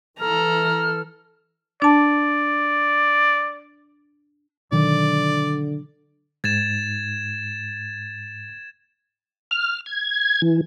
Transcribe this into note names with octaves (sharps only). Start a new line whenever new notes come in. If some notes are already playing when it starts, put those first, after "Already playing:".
E3 A4 A#5 F6
D4 D5 A5
B2 D3 D#3 F#3 D5
G#2 G#6 A6 E7
F6
G#6
E3